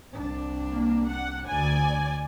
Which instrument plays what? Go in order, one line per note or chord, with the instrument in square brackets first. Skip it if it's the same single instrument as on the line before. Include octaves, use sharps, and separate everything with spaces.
[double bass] C2 D4
[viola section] A#3
F#5
[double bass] D2 [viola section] D5 G#5